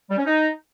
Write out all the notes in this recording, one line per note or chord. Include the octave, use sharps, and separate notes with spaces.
G3
C#4
D#4